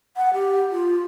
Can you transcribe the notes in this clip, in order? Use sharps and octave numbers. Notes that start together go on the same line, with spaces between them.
F#5
G4
F4